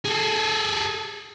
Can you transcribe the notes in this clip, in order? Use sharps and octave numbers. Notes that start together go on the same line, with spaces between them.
G#4 A4